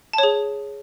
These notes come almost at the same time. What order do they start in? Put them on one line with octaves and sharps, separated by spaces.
A5 C#5 G#4